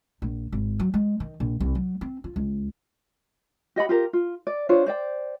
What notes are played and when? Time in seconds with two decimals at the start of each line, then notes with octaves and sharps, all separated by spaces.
0.22 A#1
0.52 G#1
0.79 F#3
0.94 G#3
1.20 D#3
1.40 A#1
1.60 C2
1.75 F#3
2.01 C4
2.24 F4
2.36 C#2
3.76 G4 D#5 F#5 B5
3.89 F4 G4 A#4
4.13 F4
4.47 D5
4.69 D4 F4 C5 C#5
4.86 C5 D5 G5